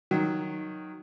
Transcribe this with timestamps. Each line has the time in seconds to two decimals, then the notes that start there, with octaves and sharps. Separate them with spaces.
0.11 D#3 F#3